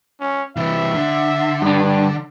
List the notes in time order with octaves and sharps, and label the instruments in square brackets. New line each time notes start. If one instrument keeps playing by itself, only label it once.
[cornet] C#4
[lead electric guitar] C3 E3 [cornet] E5
[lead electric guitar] D3
[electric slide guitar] G2 D4